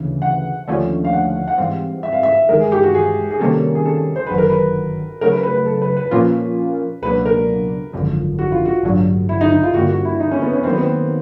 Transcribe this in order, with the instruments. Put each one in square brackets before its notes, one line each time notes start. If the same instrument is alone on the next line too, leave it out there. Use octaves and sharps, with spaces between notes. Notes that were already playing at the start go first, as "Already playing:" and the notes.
Already playing: [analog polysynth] D2 C#3 E3
[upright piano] F#5
[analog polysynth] D#2 D3 F3 A3 C#4
[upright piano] F5
F#5
F#5
[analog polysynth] G#2 E3 G3 C4 [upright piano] F5
[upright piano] E5
F5
E5
[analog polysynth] A1 G2 D#3 G#3 [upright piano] A#4
[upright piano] G#4
G4
F#4
G#4
G#4
[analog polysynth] C3 D#3 G3 A#3 C#4 [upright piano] A4
[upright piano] G#4
A4
C5
[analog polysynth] G1 F#2 D#3 F#3 [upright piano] B4
[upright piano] A#4
B4
[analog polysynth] C#3 F#3 A3 [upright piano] A#4
[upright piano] B4
B4
B4
A4
B4
B4
[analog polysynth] A#2 F3 A#3 C#4 F4
[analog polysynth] C#2 B2 F#3 A#3 D4 [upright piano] B4
[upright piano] A#4
[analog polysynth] G#1 F#2 D3 F3
[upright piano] F#4
F4
F#4
[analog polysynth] A1 G2 D3 F#3
[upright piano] E4
D#4
D#4
F4
[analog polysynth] G2 D3 G3 A#3 [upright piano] F#4
[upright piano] F#4
E4
D#4
C#4
B3
C#4
[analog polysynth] D#3 F#3 A#3 D#4 [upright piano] C4
[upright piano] B3
C4